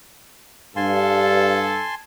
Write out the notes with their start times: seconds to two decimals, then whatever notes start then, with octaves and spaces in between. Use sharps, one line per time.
0.76 G2 A4 F5 G#5 A5 C6